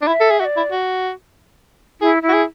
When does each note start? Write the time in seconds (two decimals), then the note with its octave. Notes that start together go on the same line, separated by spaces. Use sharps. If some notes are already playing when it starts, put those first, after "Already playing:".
0.02 D4
0.07 E4 E5
0.21 A4
0.31 G#4
0.40 F#4 E5
0.45 D5
0.57 E4
0.72 F#4
2.01 E4 G#4
2.23 E4
2.29 F#4
2.34 G#4